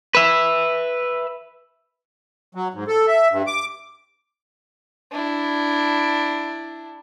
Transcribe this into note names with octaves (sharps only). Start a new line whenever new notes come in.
B4 E5
F#3
G#2
A4
E5
G2
D6
D4 E4